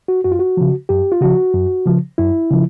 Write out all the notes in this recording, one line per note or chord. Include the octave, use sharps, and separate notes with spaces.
F#4
F#2 F#4
F4
F#4
C#3 F3
F#2 G4
F4
C#3 F3 F#4
F#2
C#3 F3
F#2 E4
C#3 F3